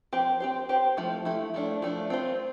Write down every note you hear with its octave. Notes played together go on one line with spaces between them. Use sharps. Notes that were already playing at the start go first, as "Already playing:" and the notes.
F3 C4 G4 C5
C4 G4 C5
C4 G4 C5
F3 A3 E4
F3 A3 E4
F3 A3 D4
F3 A3 D4
C4 F4 C5